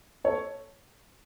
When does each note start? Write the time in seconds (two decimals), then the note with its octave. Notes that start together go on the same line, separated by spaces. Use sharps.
0.24 A4 C#5